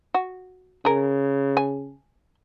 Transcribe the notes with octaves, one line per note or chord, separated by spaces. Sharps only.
F#4
C#3 G#4 A#4
G#5